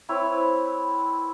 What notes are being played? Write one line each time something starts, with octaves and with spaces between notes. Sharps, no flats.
C4 E4 B4 C#5